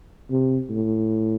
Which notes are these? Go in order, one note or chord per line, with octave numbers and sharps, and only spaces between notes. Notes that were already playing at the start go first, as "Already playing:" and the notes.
C3
A2